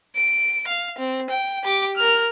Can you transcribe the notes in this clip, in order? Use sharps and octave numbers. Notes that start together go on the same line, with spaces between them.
D7
F5
C4
G5
G4 D6
A#4 F6